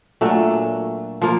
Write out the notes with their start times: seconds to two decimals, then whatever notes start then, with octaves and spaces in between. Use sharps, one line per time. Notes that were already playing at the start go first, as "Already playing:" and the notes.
0.21 A#2 F#3 A3 D4
1.22 F3 A#3